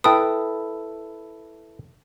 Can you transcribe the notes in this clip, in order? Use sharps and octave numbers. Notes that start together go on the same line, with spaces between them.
E4 A4 B4 G5 D#6